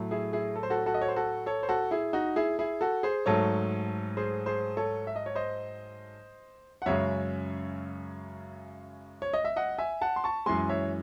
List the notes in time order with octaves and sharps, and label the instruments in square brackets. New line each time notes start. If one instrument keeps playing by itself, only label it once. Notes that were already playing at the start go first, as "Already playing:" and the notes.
Already playing: [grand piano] A2 F#3 A3
E4 G#4
E4 G#4
A4
C5
F#4 A4
F#4 A4
D#5
C#5
C5
F#4 A4
A4 C#5
C5
F#4 A4
E4 G#4
D#4 F#4
E4 G#4
E4 G#4
F#4 A4
G#4 C5
G#2 F#3 A3 A4 C#5
G#4 C5
G#4 C5
A4 C#5
E5
D#5
C#5
C5 D#5
F#5
F#2 C#3 G#3 C#5 E5
C#5
D#5
E5
D#5 F#5
E5 G#5
F#5 A5
C6
A5 C#6
F#2 E3 G#3 G#5 C6
C#5 E5